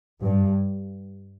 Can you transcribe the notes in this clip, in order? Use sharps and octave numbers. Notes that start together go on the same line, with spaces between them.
G2